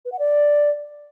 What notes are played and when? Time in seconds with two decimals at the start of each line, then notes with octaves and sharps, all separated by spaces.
0.05 B4
0.12 F#5
0.19 D5